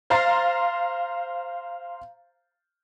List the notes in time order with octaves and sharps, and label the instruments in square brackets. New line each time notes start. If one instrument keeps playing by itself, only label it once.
[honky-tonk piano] C5 F5 A#5 C6 A6 C7